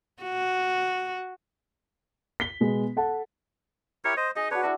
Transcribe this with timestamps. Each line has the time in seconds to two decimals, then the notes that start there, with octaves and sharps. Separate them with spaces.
0.23 F#4
2.40 B6 G7
2.60 B2 G#3 B3
2.96 A4 F#5 A5
4.05 E4 G4 A#4 C#5
4.17 C5 D#5
4.36 D#4 G#4 D#5
4.51 D4 F#4 B4 C#5
4.63 D4 E4 F#4